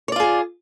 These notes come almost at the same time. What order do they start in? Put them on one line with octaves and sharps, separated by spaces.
C#5 D5 F4 G#4